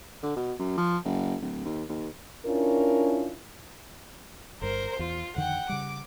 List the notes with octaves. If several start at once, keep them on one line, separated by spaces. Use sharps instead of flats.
D3
B2
F#2
F3
F#1
D1
D#2
D#2
C#4 D4 E4 F4 A#4
G1 G2 A#4 C5
E2 F4
F2 D3 D#3 F#5 G5
C#3 G3 D6